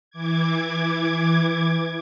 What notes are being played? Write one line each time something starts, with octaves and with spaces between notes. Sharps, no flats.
E3 D6 G#6